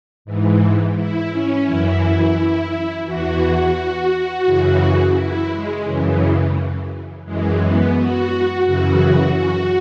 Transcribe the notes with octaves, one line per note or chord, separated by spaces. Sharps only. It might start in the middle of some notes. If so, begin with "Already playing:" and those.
G#2 E3
E4
C#4
F#2 E3 E4
E2 E3 F#4
F#2 C#3 E3
E4
G#3
F#2 C#3 E3
F#2 E3 G#3
B3
F#4
F#2 C#3 E3 F#4
F#4